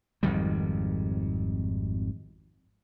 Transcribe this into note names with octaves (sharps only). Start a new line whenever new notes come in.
G#1 F2 D#3 G3